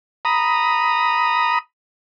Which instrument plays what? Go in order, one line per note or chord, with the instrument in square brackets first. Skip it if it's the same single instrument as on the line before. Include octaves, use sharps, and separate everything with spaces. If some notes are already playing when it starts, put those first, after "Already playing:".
[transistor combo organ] A#5 B5 D#6